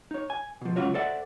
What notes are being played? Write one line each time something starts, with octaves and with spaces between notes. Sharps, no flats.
D#4 C#5
G#5
B2 F3
C#2 F#2 C#4 F4 F#4 C#5
A4 C5 D5 E5 F#5